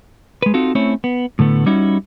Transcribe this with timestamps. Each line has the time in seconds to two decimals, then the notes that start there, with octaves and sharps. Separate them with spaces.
0.42 G#3 B4
0.54 C4 D#4 F4 F#4 A4
0.75 A3 C4 C#4 E4 C#5
1.04 B3
1.39 A2 D3 A3 B3
1.66 G3 C#4 D#4 E4 F#4